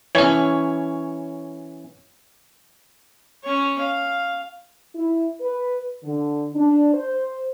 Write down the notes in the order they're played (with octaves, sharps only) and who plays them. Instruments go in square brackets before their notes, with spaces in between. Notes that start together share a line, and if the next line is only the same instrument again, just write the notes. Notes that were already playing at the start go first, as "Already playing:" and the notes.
[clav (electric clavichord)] E3 C#4 [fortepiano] C#5
[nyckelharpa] C#4 C#5
F5
[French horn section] E4
B4
D3
D4
C5